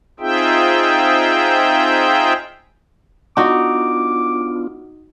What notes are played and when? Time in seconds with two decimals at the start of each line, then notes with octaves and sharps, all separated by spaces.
0.20 C4 D#4 F4 G#4 E5 G5
3.37 B3 D4 D#4 F4 F#4 D6